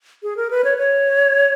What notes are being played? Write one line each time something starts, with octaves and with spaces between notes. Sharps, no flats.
G#4
A#4
B4
C#5
C#5